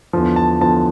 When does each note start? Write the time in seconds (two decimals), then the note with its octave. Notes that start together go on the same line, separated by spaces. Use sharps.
0.13 E2 D3 F3
0.36 A5
0.61 E2 D3 F3 A5